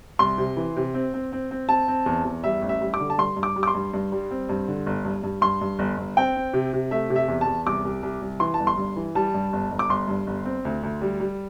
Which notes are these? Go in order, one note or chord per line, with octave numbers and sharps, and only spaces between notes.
C2 C6
C3
E3
C3
C4
C4
C4
C4
C4 A5
C4
E2
E2
G3 E5
A1
E5
G3
D6
D3
A5
G2 C6
G2
D6
G3
D6
C6
G2
G2
G3
C4
G2
D3
G1
G2
G2
G2 C6
G2
G1
G1
C4 G5
C4
C3
C3
A3 E5
C3
E5
E2
A5
E2
C2 D6
C2
C2
C2
E3 C6
A5
G1
C6
G2
E3
G3 A5
G2
G1
G1
D6
G1 C6
G2
G1
C4
D2
D2
G3
G3